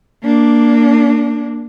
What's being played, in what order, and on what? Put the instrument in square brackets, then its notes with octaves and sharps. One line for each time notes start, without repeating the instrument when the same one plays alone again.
[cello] A#3 D4